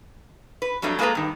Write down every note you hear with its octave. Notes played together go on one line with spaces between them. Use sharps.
B4
F2 F#3 G3 A3 D4
G#3 A#3 G#4 A4 B4 A#5
G2 D#3